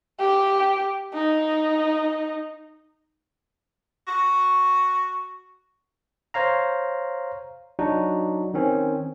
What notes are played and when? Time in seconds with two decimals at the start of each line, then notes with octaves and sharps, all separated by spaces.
0.20 G4
1.14 D#4
4.07 F#4
6.34 C5 C#5 F5 A#5
7.79 F#3 D4 D#4 F#4
8.54 D#3 C4 C#4